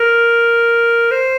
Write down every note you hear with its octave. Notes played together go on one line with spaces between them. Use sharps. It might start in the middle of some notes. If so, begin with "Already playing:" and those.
Already playing: A#4
C5